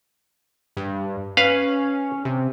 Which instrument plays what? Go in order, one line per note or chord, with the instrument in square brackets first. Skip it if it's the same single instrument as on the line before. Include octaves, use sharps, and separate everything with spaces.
[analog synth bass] G2
[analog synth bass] C#4 [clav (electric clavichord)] B4 F5
[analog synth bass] C3